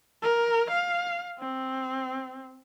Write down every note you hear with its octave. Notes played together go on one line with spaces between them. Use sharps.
A#4
F5
C4